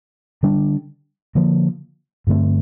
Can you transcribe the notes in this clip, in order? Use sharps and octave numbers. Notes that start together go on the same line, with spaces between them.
D3 G3 D4
D3 F3 A#3
G2 D3 A3 C4